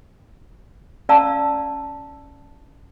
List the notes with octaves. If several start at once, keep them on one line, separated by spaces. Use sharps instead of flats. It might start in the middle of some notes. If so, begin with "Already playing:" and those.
C#4 D5 F5 A5 A#5 E6